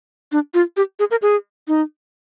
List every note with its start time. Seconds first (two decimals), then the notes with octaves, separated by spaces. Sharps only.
0.32 D4
0.54 F4
0.77 G4
0.99 G#4
1.11 A#4
1.22 G#4
1.68 D#4